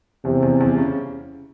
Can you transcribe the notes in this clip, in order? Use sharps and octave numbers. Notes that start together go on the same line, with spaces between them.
E2 C3
E2
E2
C#3